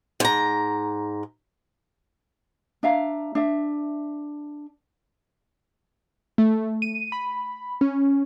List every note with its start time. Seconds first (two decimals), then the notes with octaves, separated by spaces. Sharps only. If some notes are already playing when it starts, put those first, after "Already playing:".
0.20 G#2 A#5
2.83 D4 E5 F5 A#5
3.35 D4 E5
6.38 A3
6.82 D#7
7.12 B5
7.81 C#4